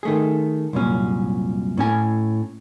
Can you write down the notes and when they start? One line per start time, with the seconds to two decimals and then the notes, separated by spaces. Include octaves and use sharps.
0.03 D#3 A3 G#4
0.73 C2 F#2 A#2 C#4
1.78 A2 C#4 G#5